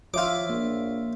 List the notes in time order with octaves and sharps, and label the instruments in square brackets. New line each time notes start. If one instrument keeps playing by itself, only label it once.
[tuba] F3 [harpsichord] F4 D6 [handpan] C#5 E5
[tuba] A#1 [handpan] A#3